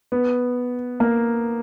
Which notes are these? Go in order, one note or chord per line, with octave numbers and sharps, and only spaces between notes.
B3
A#3